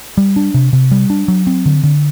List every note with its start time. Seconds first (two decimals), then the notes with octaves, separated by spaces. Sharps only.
0.17 G3
0.36 D4
0.54 C3
0.73 C3
0.91 G3
1.10 D4
1.28 F#3
1.47 C4
1.66 D3
1.84 D3